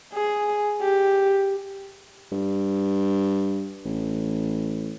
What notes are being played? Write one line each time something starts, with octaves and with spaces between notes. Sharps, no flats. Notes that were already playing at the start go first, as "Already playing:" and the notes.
G#4
G4
G2
A1